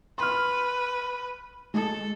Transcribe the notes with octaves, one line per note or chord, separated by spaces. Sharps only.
B4 C6 F6
G#3 A4